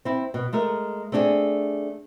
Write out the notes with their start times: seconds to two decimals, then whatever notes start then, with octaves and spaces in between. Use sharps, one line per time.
0.05 C4 E4
0.34 B2
0.53 G#3 A3 A#4
1.12 A3 C4 D4 G4 G#4